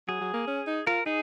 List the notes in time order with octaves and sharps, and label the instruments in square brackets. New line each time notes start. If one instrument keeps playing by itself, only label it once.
[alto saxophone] F#3 [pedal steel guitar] G#4
[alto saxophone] F#3
A#3
C#4
D#4
[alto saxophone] F4 [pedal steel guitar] A#4
[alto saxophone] D#4 [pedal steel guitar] G#4